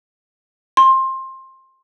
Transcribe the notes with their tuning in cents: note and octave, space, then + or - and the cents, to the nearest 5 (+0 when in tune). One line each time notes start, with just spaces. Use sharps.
C6 +20